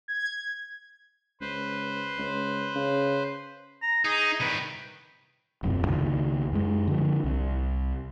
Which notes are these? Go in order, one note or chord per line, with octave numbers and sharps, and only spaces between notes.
G#6
C#2 B4 C5
C#2
C#3
A#5
D#4 G#4
C2 D#3 B4
D#1 F#2 C3
C#2 D#3
F#2 G#3
D3 F3
C2